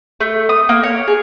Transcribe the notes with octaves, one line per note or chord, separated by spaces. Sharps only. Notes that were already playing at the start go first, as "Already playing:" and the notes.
A3
D#6
A#3
C#5
G#4